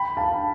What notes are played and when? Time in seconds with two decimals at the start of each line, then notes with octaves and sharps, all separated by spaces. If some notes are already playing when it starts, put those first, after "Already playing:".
Already playing: G5 B5
0.17 F5 A5